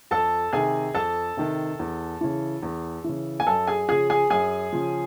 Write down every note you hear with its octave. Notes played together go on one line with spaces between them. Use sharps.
F2 A4 A5
C3 D#3 G#4 G#5
F2 A4 A5
C3 D#3
E2
C#3 E3
E2
C#3 E3
G#5
F#2 A4 A5
G#4 G#5
C#3 F3 G#4 G#5
G#4 G#5
F#2 G#4 G#5
C#3 F3